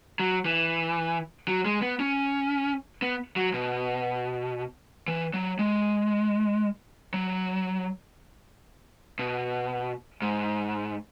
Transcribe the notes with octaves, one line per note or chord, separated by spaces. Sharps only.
F#3
E3
F#3
G#3
B3
C#4
B3
F#3
B2
E3
F#3
G#3
F#3
B2
G#2